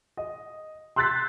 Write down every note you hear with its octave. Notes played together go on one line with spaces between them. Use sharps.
D#5
C6 E6 F#6 G6 A6 B6